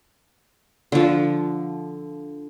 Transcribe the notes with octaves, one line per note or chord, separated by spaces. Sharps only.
D3 F3